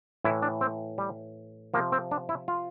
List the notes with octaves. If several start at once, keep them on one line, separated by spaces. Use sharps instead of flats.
A2 E3 E4
D4
C4
G3
C3 F3 A#3
C4
D4
E4
F4